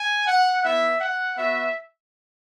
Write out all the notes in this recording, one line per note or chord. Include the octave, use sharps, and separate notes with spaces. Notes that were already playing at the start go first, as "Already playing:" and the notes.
Already playing: G#5
F#5
B3 E4 E5
F#5
B3 F#4 E5